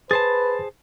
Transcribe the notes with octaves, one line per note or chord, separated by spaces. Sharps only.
G#4 B4 C5 A5 A6